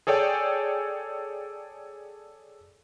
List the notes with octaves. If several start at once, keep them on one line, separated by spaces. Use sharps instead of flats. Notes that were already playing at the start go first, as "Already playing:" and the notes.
G#4 A4 C#5 D5 G5 G#5